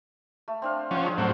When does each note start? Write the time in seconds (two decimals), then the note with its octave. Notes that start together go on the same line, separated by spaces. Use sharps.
0.48 A3
0.62 C4 D4 F5
0.91 F3 C#4 C5 F#5
1.04 D4 G#4
1.18 A2 F#3 C4 F#4 A4 A#4